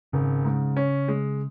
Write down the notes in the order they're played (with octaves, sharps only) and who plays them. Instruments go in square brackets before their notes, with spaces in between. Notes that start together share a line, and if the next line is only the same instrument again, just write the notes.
[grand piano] G#1 [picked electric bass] C#3
[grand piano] G#2
C#4
G#3